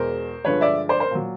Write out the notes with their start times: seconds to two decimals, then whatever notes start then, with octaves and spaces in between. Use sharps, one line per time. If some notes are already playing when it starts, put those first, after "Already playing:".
Already playing: E2 B2 G#3 A#4 C5
0.44 G2 D3 F3 G#3 B4 C#5
0.61 D5 E5
0.89 C5 D5
1.00 A#4 C5
1.11 A#2 F#3